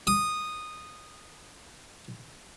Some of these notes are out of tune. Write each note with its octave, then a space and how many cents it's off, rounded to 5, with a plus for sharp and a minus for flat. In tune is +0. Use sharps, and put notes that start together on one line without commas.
D#6 -10